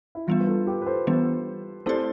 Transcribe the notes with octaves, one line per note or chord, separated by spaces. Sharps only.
E4
E3 G3 B3 D4 F4
B4
F4 A4
G4 B4
B4
A4 C5
E3 G3 B3 D4
A3 C4 E4 G4 A4 C5 D5